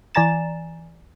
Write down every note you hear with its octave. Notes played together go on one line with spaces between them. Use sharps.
E3 D5 G#5 A#5 A6 E7